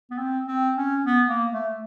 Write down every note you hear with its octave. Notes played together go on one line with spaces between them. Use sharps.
B3
C4
C4
C#4
B3
A#3
A3